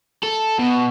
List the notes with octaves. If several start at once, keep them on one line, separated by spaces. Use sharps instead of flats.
A4
B2